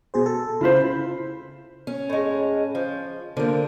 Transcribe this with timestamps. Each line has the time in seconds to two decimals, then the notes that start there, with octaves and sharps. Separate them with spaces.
0.14 B2 G#4 C5
0.26 A4
0.61 C#3 E4 F4 C5 B5
1.87 C#4
2.09 A2 G#3
2.75 F3
3.37 D3 F3 A#3